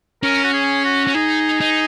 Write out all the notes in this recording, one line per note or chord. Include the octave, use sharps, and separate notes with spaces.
C#4 A#4
F#4
G#4
F#4
C#4
D#4 G#4
D#4